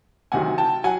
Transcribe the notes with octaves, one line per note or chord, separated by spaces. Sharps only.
D2 C3 D#3 F#3 F#5 G#5
G5 A5
F#3 F#5 G#5